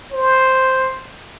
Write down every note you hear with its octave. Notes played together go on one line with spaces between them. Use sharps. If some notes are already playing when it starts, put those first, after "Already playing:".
C5